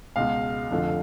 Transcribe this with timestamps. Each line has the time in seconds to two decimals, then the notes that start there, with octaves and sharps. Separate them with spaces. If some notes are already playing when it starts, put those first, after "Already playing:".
0.16 C#2 B2 G#3 F5
0.70 F1 F2 D3 F3